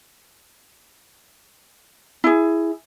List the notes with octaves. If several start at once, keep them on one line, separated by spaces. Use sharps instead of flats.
E4 G#4